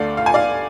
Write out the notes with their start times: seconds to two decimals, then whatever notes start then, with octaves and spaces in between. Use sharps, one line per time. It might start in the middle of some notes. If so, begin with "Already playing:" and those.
Already playing: D2 D3 A3 D5 F5
0.17 F5
0.26 G#5
0.34 D5 F5